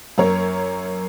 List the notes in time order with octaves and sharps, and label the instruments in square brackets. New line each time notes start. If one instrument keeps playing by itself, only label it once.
[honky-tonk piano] F#2 A#3 A#4 C#5